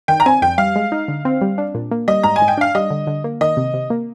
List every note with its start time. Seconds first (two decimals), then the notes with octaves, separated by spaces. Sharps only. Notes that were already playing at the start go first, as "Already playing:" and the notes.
0.08 D#3 G5
0.20 A#5
0.26 C4 G#5
0.42 F2 G5
0.58 G3 F5
0.76 G#3
0.92 D#4
1.08 D3
1.25 C4
1.41 G3
1.58 D4
1.75 A#2
1.91 A#3
2.08 G3 D#5
2.23 G#2 A#5
2.36 G#5
2.42 G#2
2.48 G5
2.58 D4 F5
2.75 G3 D#5
2.91 D3
3.07 D3
3.24 A#3
3.41 D#3 D#5
3.57 C3
3.74 C3
3.90 A#3